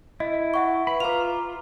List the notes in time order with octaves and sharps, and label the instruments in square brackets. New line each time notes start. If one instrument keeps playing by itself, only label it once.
[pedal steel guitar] E4 [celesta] D#5
[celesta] E5 F#5 C#6
[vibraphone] B4 [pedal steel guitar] B5
[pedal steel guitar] F4 [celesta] B4 F7 [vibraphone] F5 A#5 D6